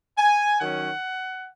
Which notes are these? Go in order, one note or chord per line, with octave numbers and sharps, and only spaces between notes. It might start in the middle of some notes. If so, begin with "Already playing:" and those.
G#5
D#3 F#3 C#4 F#5